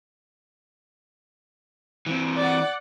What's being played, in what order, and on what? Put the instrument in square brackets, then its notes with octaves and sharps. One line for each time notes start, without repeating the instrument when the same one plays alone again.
[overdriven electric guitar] E3 C4
[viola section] D5 F#5